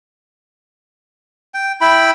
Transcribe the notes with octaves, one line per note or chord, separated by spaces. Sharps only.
G5
E4 G5 B5